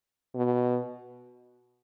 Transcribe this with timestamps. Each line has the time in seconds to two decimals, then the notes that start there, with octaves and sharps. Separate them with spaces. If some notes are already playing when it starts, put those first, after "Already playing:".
0.35 B2